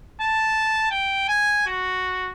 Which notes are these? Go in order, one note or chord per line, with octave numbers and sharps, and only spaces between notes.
A5
G5
G#5
F#4